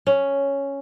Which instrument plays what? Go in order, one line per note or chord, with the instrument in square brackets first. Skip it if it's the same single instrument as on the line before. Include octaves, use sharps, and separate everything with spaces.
[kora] C#4